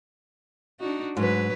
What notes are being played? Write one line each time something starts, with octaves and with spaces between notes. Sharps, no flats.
D4 D#4 F#4
G#2 F#3 B4